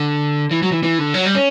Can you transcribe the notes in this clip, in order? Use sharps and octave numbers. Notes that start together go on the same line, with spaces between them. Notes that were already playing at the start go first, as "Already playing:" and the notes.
Already playing: D3
E3
F#3
E3
E3
D3
F#3
G3
C#4